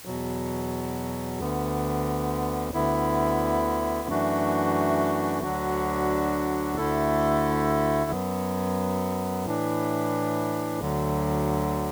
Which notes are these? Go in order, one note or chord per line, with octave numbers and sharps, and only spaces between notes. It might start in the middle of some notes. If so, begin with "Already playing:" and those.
E2 B2 F#3
D2 D3 B3
D2 D3 B3 E4
F#2 E3 A3 D4 F#4
D2 D3 F#3 D4 F#4
D2 D3 A3 E4 A4
F#2 F#3 B3
A2 E3 D4
D2 D3 F#3